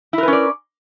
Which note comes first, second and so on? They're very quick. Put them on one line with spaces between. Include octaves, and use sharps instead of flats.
E4 A#4 B4 C#4 D5